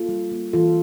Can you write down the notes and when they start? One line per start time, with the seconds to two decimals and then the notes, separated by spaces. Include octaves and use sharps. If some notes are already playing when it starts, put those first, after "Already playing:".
Already playing: A#3 F4 A4
0.09 G3
0.32 A#3
0.53 E3 F4 A4